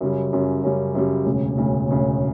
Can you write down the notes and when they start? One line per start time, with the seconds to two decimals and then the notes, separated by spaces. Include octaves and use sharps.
0.01 F#2 C#3 G3
0.33 F#2 C#3 G3
0.63 F#2 C#3 G3
0.95 F#2 C#3 G3
1.26 E1 D2 C#3
1.56 E1 D2 C#3
1.88 E1 D2 C#3